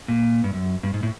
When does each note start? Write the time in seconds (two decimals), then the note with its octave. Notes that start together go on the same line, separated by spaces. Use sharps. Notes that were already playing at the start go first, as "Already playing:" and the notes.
0.08 A#2
0.44 G2
0.53 F#2
0.83 G2
0.94 G#2
1.03 A2